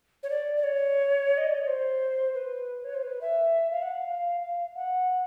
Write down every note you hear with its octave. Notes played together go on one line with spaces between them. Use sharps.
C#5
D5
D5
C#5
D#5
D5
C#5
C5
B4
C#5
C5
B4
E5
F5
F#5
F5
F#5